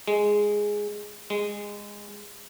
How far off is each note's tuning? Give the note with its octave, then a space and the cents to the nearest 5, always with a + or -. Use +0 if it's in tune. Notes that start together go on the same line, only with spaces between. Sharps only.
G#3 +0
G#3 -15